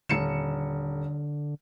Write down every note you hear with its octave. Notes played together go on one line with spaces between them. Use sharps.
D#1 D3 C#7 E7